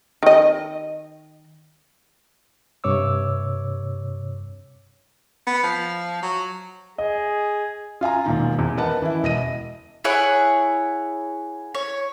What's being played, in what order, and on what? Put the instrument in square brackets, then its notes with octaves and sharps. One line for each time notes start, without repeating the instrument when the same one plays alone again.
[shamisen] D#3 D#5
[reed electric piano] G2 C3 C#5 D6 E6
[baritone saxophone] B3
F3
F#3
[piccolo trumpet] G#4 [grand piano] D#5
[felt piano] F4 F5 G#5 A#5
E1 A#2 D#3
E2
A#4 B4 D#5 F#5 A5
E3 E4
E1 D#5 A#6 D#7
[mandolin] E4 G#4 C#5 F#5
C#5